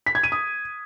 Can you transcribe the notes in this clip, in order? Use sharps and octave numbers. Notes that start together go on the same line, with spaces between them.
B6
G#6
D#7
D#6